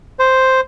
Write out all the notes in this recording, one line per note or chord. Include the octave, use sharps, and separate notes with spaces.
C5